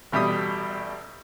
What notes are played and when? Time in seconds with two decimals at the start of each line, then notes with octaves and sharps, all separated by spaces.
0.12 A1 B2 G3 E5 B5 D#6